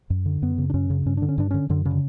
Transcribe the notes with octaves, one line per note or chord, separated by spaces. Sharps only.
F#2
D3
F#2 B3
C#3
D4
F#2 C#4
C#3
G2 C#4
D3 D4
C#4
G2 D4
D3 C#4
F#2 D3
C#3
D3